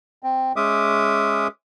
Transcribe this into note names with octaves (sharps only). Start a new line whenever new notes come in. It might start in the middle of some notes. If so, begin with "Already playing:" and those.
C4
G#3 C#4 E5 D6 D#6